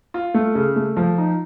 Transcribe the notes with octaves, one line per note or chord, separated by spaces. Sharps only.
F4
A3
C#3
A3
F3
D#4